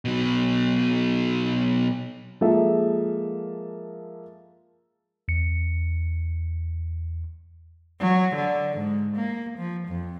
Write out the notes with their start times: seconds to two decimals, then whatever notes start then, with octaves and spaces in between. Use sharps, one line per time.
0.05 B2 F#3
2.41 F3 G#3 A#3 A4 A#4 E5
5.28 E2 C#7
8.00 F#3
8.35 D3
8.77 G#2
9.16 A#3
9.58 F3
9.88 F2